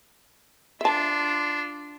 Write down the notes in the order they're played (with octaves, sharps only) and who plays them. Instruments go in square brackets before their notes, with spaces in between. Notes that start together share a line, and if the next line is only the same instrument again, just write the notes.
[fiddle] D4 F4 [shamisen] E5 A5